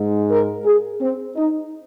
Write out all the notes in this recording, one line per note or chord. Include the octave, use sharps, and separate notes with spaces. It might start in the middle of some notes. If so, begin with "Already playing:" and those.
Already playing: G#2 G#3
A#4
G#4
C4
D#4